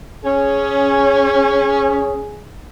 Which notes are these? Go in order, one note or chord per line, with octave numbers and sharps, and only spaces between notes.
C#4 G#4